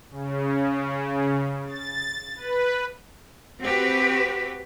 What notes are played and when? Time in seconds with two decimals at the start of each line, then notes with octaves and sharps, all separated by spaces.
0.11 C#3
1.66 A6
2.36 B4
3.61 C4 F#4 G4 B4